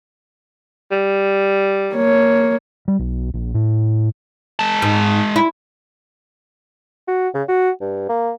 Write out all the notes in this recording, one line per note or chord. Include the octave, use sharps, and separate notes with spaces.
G3
A#3 C#5
G3
B1
A#1
A2
G#3 A5
G#2
E4
F#4
C#3
F#4
G2
A#3